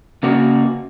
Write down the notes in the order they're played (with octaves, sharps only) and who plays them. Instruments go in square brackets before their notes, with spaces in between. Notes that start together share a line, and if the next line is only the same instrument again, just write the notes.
[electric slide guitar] C#3 A#3 F#4